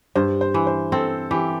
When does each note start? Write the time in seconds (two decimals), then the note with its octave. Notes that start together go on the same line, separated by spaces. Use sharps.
0.15 G2 C5
0.41 C5
0.54 E3
0.67 C5
0.92 C4 A4
1.31 E3 G4